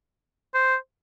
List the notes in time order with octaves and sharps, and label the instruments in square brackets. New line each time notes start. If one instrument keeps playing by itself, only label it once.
[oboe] C5